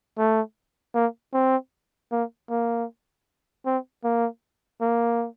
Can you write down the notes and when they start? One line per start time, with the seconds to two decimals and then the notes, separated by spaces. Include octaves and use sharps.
0.18 A3
0.95 A#3
1.33 C4
2.12 A#3
2.50 A#3
3.66 C4
4.04 A#3
4.81 A#3